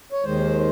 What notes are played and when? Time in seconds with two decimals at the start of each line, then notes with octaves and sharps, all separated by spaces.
0.12 C#5
0.24 D#2 D#3 G#3 C5